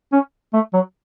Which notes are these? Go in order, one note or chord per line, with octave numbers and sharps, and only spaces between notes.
C#4
A3
F#3